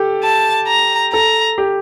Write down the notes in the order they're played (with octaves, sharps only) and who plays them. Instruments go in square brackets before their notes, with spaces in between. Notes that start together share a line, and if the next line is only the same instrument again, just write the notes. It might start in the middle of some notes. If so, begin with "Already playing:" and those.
Already playing: [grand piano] G4 A4
[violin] A5
A#5
[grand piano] A4 [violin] A#5
[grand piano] G4